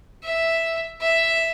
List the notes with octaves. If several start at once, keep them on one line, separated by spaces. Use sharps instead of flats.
E5
E5